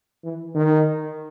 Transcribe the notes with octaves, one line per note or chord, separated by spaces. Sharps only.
E3
D#3